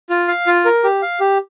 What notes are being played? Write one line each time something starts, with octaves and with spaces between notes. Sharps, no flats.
F4
F5
F4
A#4
G4
F5
G4